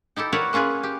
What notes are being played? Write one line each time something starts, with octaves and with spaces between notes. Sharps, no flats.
D#4 E4 G4 A4
E4 F#4 A#4 B4 C#5 D5
A#3 C#4 F4 G#4 B4
G4